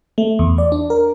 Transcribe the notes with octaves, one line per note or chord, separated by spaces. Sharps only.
A3
E2
D5
D4
A#4